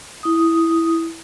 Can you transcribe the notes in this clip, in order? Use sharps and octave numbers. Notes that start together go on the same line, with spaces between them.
E4 D#6